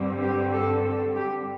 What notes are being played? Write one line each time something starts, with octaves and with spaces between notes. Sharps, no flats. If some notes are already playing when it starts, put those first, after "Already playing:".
Already playing: G2 D3 G3 C4
G4
A4
A4
G4